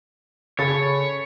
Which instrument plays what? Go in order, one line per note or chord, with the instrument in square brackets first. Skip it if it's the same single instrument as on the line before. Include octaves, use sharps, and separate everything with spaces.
[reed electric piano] C#3 G#4 A4 [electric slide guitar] C#5 [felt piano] B5 A6